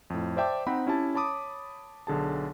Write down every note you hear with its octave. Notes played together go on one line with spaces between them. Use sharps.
F2 A2
C5 D5 E5 G5 A5 D6
C4 D#4 F#5 B5
C#4 E4 G4 A5
C#5 A5 B5 D6 D#6
B1 D3 G#4 A5